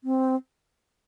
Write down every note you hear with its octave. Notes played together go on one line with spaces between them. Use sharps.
C4